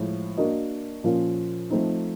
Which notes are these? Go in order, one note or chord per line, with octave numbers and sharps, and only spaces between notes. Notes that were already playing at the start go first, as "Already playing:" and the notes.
Already playing: A2 F3 G#3
A#3 D4 F#4 A#4 D#5
A#2 F3 A#3 C#4 F4
F3 A3 C4 D#4